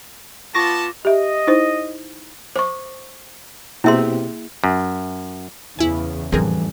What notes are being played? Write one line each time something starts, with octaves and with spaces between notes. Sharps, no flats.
B3 F4 A5 C#6 D6 A#6
G4 D#5 E5
D#4 E4 C5
C5 C#6 D6
B2 A#3 C4 E4 G4 G#4 E5 C6
F#2
E2 C#3 E4 G#5
F2 A2 D3 E3 G3 C4 G#4 A#4